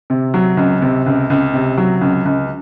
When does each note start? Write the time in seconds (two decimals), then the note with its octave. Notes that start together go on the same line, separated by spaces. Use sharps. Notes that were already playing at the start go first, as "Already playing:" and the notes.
0.10 C3
0.34 F#3
0.57 C#2
0.82 C3
1.06 C#2
1.30 C#2
1.53 C3
1.77 F#3
2.01 C#2
2.25 C#2